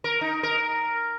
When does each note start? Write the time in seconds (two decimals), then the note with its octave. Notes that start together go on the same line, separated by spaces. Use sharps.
0.04 A#4
0.21 D#4
0.43 A#4